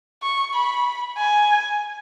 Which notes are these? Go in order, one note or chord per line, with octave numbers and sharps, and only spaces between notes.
C#6
B5
G#5